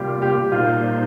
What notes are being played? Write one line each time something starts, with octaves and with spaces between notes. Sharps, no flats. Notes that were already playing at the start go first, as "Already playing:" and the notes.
Already playing: C3 G3 A#3 F4 G4
G4
A#2 G3 A#3 D#4 F4 C5